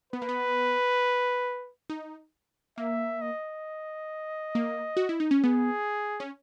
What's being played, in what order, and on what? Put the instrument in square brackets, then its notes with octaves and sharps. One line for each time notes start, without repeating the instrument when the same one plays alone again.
[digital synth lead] B3 [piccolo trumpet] B4
[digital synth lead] A#3
B3
D#4
[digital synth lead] A#3 [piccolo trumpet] E5
[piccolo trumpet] D#5
[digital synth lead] A#3
F#4
E4
D#4
C#4
[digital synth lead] B3 [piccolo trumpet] G#4
[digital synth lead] C#4